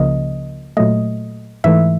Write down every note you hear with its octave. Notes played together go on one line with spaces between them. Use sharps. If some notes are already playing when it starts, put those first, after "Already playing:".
Already playing: C#2 C#3 F3 A#3 D#5
A#2 F#3 A3 D#5
G#2 E3 A3 E5